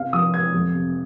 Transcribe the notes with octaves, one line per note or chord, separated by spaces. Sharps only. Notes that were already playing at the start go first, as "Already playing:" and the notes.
Already playing: C3 F5
F3 D#6
C4 G#6
F2
C3